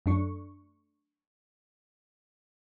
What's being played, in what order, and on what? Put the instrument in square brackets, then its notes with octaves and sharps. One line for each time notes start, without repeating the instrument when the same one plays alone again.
[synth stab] F#2 A3 D4 C#6